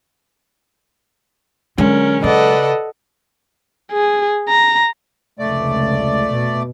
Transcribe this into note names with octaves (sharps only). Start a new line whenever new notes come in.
D3 F#3 G#3 C#4 A#4
C#3 A4 B4 D5 D#5 F#5
G#4
A#5
F1 C#2 A3 D5
B2